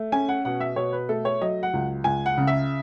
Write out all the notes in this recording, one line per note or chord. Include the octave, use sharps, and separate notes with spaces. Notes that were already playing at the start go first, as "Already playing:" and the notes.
Already playing: A3
C#4 G#5
F#5
B2 F#5
E5
B2 C#5
B4
A3 A4
C#5
F#3 D#5
F#5
C#2
C#2 G#5
F#5
C#3
E5